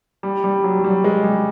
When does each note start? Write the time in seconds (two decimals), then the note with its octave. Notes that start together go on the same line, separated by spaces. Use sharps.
0.23 G3
0.44 G3
0.64 F#3
0.79 F#3
0.84 G3
1.04 G#3
1.24 G3